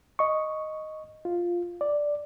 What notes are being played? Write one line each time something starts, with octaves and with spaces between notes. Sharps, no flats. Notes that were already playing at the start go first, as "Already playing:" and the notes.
D#5 C#6
F4
D5